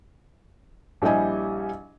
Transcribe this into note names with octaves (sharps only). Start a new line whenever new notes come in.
A#1 G3 E4 G4 D#5 G#5